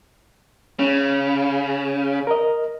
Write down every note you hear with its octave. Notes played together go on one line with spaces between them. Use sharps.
C#3 C#4
A#4 D#5